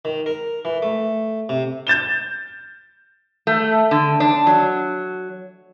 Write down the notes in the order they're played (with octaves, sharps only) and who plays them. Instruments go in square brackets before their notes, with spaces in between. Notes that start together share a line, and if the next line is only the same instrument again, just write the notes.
[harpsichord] D#3
A#4
E3
A3
C3
[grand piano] G6 A6 E7 G7
[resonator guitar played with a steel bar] A3
D3
D4
F#3